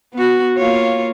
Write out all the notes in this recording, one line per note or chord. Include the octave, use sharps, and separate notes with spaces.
B3 F#4
A#3 F4 C#5